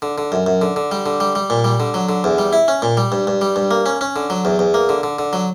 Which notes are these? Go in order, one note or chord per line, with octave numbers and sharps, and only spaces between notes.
D3
D3
F#2
F#2
D3
D3
G3
D3
G3
G3
A#2
G3
D3
F#3
D3
E2
G3
E4
C#4
A#2
G3
G2
G2
G3
G2
A#3
C#4
C#4
D3
F#3
E2
E2
A#3
D3
D3
D3
F#3